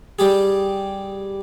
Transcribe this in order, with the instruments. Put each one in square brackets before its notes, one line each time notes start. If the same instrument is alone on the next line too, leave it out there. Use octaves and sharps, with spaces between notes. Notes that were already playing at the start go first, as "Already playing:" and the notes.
[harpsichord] G3 G4 G#4